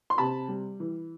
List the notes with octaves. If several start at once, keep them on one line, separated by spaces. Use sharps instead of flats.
C6
C3 A5 B5
G3
E3